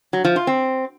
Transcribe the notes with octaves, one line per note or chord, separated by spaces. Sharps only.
F#3
F3
F4
C4